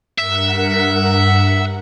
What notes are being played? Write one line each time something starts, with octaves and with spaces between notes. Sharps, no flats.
G2 A#4 E5 F#5